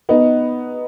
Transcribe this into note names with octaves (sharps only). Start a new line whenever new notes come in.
B3 D#4